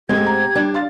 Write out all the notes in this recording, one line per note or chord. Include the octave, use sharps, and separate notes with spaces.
G#2 G#3 A3 C4 G4 G#6
A#5
G3 D4
F5 C6 A6